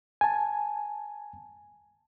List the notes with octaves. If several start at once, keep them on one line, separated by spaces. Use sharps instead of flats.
G#5 A5